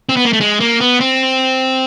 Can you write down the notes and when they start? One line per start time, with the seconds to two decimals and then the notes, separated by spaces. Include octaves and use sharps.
0.09 C4
0.16 B3
0.25 A#3
0.33 A3
0.41 G#3
0.60 A#3
0.80 B3
1.00 C4